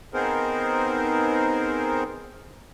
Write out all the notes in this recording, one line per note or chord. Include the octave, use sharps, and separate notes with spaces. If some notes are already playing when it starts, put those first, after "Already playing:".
B3 C4 D#4 G#4 A#4 C5